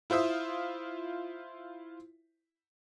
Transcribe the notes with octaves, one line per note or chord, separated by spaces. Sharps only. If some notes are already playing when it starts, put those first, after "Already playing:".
E4 F4 C5 E5 D#6